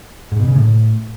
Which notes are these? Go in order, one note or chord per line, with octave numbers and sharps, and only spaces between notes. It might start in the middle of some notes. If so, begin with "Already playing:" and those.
G#2
B2
C#3
A2